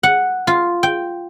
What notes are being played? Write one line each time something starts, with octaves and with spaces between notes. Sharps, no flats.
F#5
F4
G5